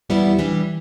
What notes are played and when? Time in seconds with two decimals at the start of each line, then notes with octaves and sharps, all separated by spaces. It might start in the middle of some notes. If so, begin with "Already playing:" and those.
0.10 E2 E3 G3 B3 E4
0.39 E3 G3 D4 G4